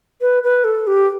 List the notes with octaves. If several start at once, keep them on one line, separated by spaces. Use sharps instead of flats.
B4
B4
A4
G4